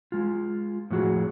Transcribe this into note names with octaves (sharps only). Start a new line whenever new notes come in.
G#3 F4
A2 F3 F#4 G#4